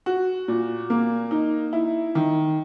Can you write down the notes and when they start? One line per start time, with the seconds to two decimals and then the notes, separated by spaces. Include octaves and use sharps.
0.06 F#4
0.48 A#2
0.90 A#3
1.31 D#4
1.73 E4
2.15 D#3